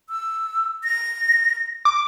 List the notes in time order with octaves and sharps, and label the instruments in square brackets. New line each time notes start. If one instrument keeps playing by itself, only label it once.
[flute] E6
A#6
[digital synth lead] D6